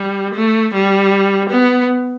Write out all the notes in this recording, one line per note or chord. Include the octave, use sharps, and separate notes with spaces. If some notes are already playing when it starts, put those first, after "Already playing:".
Already playing: G3
A3
G3
B3